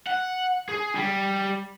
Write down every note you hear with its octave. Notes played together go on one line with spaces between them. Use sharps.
F#5
G#4
G3